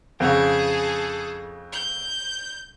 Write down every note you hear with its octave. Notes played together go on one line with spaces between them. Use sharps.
F2 C#3 G#4 A4
G6